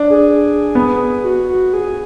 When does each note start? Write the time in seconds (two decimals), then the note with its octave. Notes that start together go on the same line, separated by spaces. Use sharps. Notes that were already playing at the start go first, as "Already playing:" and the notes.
Already playing: D4
0.10 G#4
0.75 B3
1.24 F#4
1.49 F#4
1.73 G#4